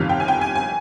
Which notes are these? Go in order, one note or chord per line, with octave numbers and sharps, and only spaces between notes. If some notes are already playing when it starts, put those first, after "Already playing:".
Already playing: G1 F2 C3 D#3 F5
G5
G#5
G5
G#5
G#5